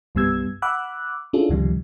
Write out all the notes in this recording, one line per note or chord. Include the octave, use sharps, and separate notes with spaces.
C2 G2 G3 B3 E6 G#6
F#5 B5 D6 E6 F#6
C#4 D4 E4 F4 G#4 A4
C#2 G2 C3 D#3 F3 G3